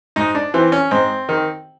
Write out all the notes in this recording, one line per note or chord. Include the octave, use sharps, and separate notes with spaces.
G#2 D#4
D4
E3 C4
C#4
G#2 C4
D#3